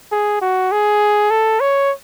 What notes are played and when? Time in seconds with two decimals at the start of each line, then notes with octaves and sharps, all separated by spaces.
0.12 G#4
0.41 F#4
0.72 G#4
1.30 A4
1.60 C#5